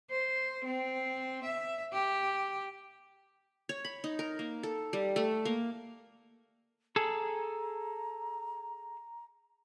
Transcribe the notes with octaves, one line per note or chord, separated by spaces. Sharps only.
C5
C4
E5
G4
C#5
B5
D#4
A#4
A#3
A4
G3
A3
A#3
G#4 A4 A#5